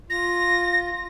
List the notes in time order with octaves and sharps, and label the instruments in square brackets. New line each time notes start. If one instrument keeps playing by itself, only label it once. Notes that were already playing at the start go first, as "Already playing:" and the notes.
[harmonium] F4 [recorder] A#6